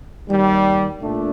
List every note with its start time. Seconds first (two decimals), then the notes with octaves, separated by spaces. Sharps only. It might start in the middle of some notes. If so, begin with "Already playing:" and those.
0.26 D#2 D#3 G3
1.01 A#2 A3 D4